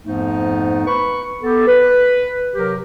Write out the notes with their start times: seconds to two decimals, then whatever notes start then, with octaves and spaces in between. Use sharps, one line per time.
0.05 F2 G#2 F3 A3 B3 D#4
0.87 B4 B5 C#6
1.42 B3 G4 A4
1.67 B4
2.55 C3 F#3 G4 A#4